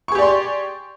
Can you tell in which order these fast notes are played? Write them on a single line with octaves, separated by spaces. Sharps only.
C#6 G#4 G4 D5 C6